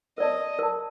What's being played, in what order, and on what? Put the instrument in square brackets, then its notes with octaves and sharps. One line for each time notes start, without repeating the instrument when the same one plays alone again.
[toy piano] A#4 D5 A5 [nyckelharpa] D#5
[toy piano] A#4 D5 A5